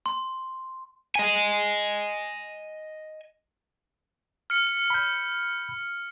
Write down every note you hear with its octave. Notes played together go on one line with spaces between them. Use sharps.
C6
D#5 G#5
F6 C#7
B5 G6